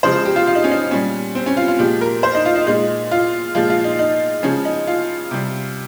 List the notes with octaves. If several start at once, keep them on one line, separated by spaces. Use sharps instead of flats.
C#3 F3 G#3 C5
G4
F4
F4
D#4
C#4
D#4
A#2 G3 C#4
C4
C#4
F4
F4
A#2 F3 G#3 G4
A#4
C5
D#4
F4
D#4
A#2 G#3 D#4
F4
A#2 F3 G#3 F4
F4
D#4
D#4
C#3 F3 G#3 C#4
D#4
F4
C3 G3